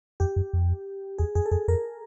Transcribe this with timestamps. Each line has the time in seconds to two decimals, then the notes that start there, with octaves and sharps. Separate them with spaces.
0.20 F2 G4
0.36 F#2
0.53 F2
1.18 E2 G#4
1.35 F2 G#4
1.46 A4
1.51 F2 G#4
1.68 F2 A#4